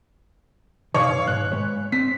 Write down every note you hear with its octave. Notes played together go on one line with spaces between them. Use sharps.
F#2 B2 D#3 C#5 F5
B1 G#2 F#6
G#3 B4 C#5
C4 B6